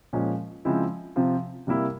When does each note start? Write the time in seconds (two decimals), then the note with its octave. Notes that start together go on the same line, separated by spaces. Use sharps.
0.13 A#2 F3 G#3 C#4
0.65 C#3 F3 G#3 C4 E4
1.16 C3 F3 C4 F4
1.67 C3 G3 A#3 E4